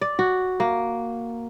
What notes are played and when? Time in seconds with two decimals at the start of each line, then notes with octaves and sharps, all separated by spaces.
0.01 D5
0.19 F#4
0.60 A#3